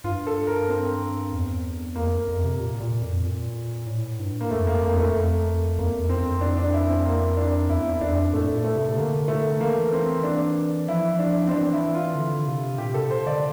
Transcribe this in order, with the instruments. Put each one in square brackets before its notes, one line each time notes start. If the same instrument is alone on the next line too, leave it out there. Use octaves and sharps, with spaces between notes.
[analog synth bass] G2 [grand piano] F4
[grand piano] A4
A#4
C4
[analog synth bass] E2
[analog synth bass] F2 [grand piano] A#3
[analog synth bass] F2
C3
A#2
A#2
F2
A#2
A2
G2
[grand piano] A#3
[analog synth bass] F2 [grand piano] A3
[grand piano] A#3
[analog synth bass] F2 [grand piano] A#3
[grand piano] A3
[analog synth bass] F2
[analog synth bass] E2 [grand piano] A#3
[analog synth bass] F2
[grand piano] C4
[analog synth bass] F2
[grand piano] D4
D4
E4
C4
A#3
D4
[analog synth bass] E2 [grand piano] E4
[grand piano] E4
[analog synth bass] F2 [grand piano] D4
[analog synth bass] A2 [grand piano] A3
[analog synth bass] A#2
[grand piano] A3
[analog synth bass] C3
[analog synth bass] D3 [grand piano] A#3
[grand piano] A3
[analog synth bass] E3 [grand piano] A#3
[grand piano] C4
D4
[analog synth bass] F3 [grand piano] E4
[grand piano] D4
C4
[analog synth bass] E3 [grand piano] D4
[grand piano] E4
F4
[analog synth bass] D3
C3
[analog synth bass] A#2 [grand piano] G4
[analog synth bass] C3 [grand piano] A4
[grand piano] C5
[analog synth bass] D3 [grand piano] D5